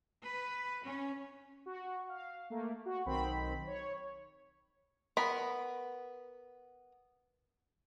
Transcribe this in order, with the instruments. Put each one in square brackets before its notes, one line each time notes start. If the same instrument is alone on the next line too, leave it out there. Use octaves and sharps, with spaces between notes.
[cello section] B4
C#4
[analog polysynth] F#4
F5
A3 A#3
F#4
B1 D#3 C4 B5
C#5
[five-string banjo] B3 A#4 B5